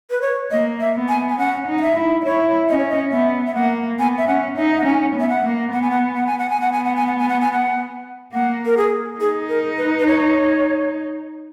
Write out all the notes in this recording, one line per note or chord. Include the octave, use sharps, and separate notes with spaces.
B4
C#5
A#3 D#5
E5
B3
G#5
G#5
C#4 F#5
D#4
F#5
E5
E4
D#5
E4 C#5
C#4 D#5
C#5
D#5
B3 E5
E5
A#3 F#5
B3 G#5
E5
C#4 F#5
D#4 E5
F#5
C#4 G#5
B3
E5
F#5
A#3
B3 F#5
G#5
F#5
F#5
G#5
F#5
G#5
B3 F#5
G#5
F#5
G#5
F#5
G#5
F#5
G#5
F#5
A#3 F#5
A#4
G#4
D#4 G#4
A#4
B4
B4
C#5